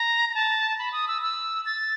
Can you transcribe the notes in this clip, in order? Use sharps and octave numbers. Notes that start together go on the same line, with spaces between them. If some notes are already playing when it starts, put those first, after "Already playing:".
Already playing: A#5
A#5
A5
B5
D#6
E6
E6
A6